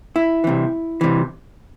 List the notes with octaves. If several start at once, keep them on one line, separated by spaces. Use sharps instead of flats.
E4
C2 C3 E3
C2 C3 E3